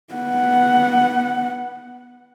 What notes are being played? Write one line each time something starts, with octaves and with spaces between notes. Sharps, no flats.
B3 F#5